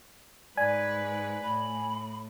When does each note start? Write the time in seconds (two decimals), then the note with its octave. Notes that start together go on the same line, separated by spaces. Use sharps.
0.57 G#2 B4 D5 G#5
1.43 A2 B5